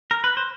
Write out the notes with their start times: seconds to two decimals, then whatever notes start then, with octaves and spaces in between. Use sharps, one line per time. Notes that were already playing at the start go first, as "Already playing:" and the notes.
0.11 A#4
0.24 B4
0.37 C5